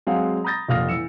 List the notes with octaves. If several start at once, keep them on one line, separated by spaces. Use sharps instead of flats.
F#3 G#3 C4 G#4 F5 F#5
A#5 B5 D#6 G6 A6 A#6
F1 A#2 F5 D#6 F6 A#6
E3 E6 C#7 E7